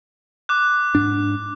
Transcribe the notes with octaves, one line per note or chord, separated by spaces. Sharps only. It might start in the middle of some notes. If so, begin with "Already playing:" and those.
D6 F#6
G#2 D4